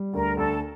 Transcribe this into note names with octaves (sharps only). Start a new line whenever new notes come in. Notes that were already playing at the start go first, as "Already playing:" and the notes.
Already playing: G3
D2 A#4
D2 A4